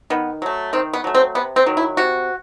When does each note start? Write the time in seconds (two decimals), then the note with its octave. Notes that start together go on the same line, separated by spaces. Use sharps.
0.10 D#3 B3
0.42 F#3 A3
0.73 D#3 C4
0.93 B3
1.04 F#3 A3
1.15 C4
1.35 C3 B3
1.56 C4
1.66 D#3 F#3
1.77 E4
1.97 C3 F#4